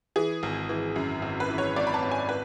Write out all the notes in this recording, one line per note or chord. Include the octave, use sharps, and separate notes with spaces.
E3 G#4
G#1
E3
F#2
G#1
B4
E3
C#5
G#1 D5
B5
A5
G#1
G#5
B4